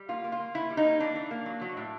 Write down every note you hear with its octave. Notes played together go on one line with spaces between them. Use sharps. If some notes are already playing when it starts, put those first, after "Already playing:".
Already playing: G3
A#3 F4
A#3
F4
A#3
E3 E4
G3
D#4
A#3
E3 D4
E3
A#3
F#3
F#3
A2